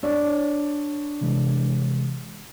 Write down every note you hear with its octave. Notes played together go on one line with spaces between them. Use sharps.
D4 C#5 D5
C3 E3 G#3